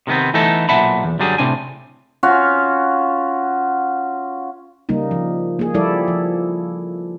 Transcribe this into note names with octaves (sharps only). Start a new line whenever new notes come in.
C3 D#3 G#3 B3 C4
E3 A3 B3 D#4 A4
B1 A#2 E5 F#5 A5 B5
E2
F#2 D3 F#3 G3 G#4
A2 C3 C4 D4 G#5
C#4 F4 F#4
C#3 G3 A#3 D#4
F3
A#3 G#4
F3 G3 E4 A4 D5
F3